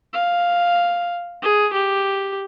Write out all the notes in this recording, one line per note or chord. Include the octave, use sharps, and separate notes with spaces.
F5
G#4
G4